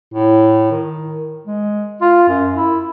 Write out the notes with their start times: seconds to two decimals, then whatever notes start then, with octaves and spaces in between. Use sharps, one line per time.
0.14 A2
0.71 D#3
1.47 G#3
2.01 F4
2.28 F#2
2.56 E4